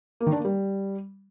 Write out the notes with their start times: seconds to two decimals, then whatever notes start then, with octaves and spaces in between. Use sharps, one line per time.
0.20 A#3
0.27 D#3
0.33 D4
0.39 A#3
0.45 G3